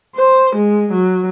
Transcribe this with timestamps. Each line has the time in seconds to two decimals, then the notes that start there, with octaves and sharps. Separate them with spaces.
0.16 C5
0.56 G#3
0.92 F#3